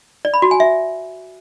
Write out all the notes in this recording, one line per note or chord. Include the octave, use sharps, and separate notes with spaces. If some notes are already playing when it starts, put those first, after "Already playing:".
D5
B5
F#4
G#5
E5